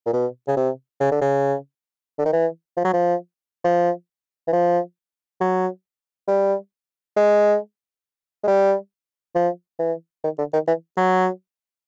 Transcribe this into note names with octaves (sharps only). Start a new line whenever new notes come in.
A#2
B2
C#3
C3
C#3
D3
C#3
D3
D#3
E3
F3
F#3
F3
F3
E3
F3
F#3
G3
G#3
G#3
G3
F3
E3
D#3
D3
D#3
E3
F#3